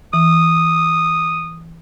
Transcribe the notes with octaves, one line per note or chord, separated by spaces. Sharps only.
E3 D#6